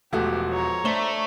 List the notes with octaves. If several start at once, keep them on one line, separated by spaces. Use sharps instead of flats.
E1 F3 A3 B3 F#4 G4
C#5 A#5
A3 D4 C5 G7